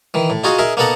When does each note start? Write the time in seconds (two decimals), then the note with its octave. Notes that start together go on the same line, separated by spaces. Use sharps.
0.14 D#3 E3
0.30 A2
0.44 D#4 F4 F#4 G#4 D#5 F5
0.59 D#4 G#4 A#4 E5
0.77 A#3 B3 D#4 A4 F#5 A#5